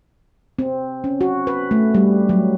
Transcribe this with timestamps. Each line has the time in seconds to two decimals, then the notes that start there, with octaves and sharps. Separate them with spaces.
0.59 C4
1.04 C#4
1.21 F#4
1.47 B4
1.71 A3
1.95 G3
2.29 F#3